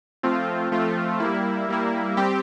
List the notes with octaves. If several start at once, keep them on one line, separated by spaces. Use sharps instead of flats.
F3 A3 C4 F4
F3 A3 C4 F4
G3 A#3 E4
G3 A#3 E4
G3 C4 G4